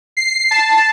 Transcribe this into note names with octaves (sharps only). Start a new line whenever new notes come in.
C7
A5